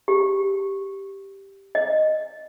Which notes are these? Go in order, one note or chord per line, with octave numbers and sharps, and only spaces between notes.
G4
D#5